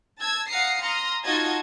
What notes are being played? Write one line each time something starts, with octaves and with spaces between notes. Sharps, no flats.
A5 E6 G#6
F5 F#5 A#5 D#6 C7 C#7
A#5 C6 D#6 F6
D#4 F4 F#4 D#5 A5 G#6